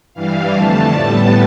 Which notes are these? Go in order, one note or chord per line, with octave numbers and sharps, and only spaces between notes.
G2 E3 G3 F5
F2 D3 A3 A5
A2 G3 B3 A5